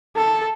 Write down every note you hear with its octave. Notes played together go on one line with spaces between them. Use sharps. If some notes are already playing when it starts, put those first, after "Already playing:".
A4